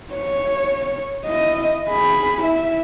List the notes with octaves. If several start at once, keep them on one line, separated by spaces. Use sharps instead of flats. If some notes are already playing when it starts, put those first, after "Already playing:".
C#5
E4 D#5
G#4 B5
E4 E5